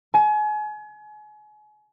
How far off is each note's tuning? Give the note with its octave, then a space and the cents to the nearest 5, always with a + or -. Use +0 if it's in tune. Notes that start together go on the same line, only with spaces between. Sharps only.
G#5 +35